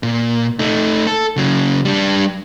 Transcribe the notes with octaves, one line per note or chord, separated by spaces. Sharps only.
A#2
A3 D#4
A4
C#3 F#3
G3 D4